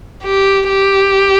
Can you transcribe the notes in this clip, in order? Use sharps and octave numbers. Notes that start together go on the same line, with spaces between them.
G4
G4